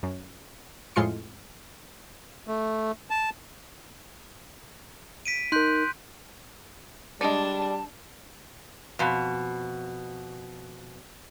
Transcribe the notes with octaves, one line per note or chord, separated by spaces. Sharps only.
F#2
F2 A2 G#3 F4 C6 C#7
A3
A5
B6 D7 D#7
D#4 A#4 C6 F#6 G6
G3 G#3 D4 D5 A5
F2 B2